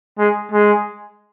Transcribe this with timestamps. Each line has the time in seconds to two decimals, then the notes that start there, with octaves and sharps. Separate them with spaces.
0.19 G#3
0.52 G#3